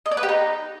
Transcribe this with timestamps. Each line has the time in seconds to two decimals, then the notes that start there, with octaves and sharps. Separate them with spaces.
0.06 D#5
0.11 D5
0.17 B4
0.23 G4
0.29 D#4